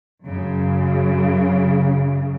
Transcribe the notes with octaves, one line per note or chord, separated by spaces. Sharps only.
F#2 C#3